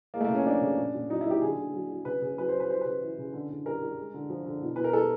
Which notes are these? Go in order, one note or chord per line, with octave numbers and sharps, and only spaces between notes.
G#3 A#3
A3
C#3 A#3
C#4
F3 D4
C#3
A#2
A#2
F#3 D#4
E4
F#3 G4
D3 G#4
D3
F#3
F#3
C#3 B4
C#3
F#3 B4
C5
F#3
B4
G3 C5
C#3 B4
E3
C#3
D3
D3
G3 A#4
G3
G#3
D3
F3
D3
B2
B2 B4
A#4
G3 A4